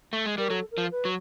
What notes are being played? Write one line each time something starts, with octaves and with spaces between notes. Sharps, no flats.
A3
G#3
G3 A#4
F#3 A4
A#4
F3
B4
F#3